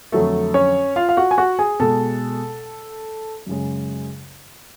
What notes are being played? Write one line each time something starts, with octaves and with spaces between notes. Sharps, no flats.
F2 D3 F#3 A3 A4
C#4 C#5
F4 F5
F5
F#4 F#5
G#5
F#4 F#5
G#4 G#5
B2 G#3 A4 A5
F#2 C#3 G#3